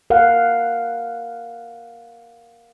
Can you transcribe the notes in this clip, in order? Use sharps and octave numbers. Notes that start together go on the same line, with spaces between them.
A#4 F5 F#5